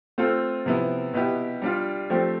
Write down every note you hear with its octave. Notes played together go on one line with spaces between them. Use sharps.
A3 C4 F4 A4
C3 F3 B3 E4
B2 B3 E4 G4
G3 D4 F4
F3 A3 C4 G4